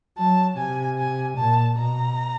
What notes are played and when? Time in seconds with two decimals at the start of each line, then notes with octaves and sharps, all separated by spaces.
0.18 F#3 A5
0.58 C3 G#5
0.98 G#5
1.38 A#2 A5
1.78 B2 A#5